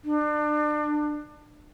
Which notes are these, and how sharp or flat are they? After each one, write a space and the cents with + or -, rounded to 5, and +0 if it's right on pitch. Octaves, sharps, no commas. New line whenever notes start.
D4 +30